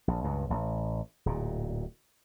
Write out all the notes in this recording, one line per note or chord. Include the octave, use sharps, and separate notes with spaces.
A#1
C#2 G2
A1
D1 A#2